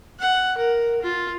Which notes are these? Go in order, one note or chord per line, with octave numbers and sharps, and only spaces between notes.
F#5
A#4
F4